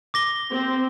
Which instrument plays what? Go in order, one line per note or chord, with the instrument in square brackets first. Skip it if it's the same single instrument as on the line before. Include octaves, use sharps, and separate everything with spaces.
[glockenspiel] D6 A#6 G7
[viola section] C4